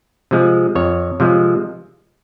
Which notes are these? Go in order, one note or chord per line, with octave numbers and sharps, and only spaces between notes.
C3 F3 G#3
F2 C#5
C3 F3 G#3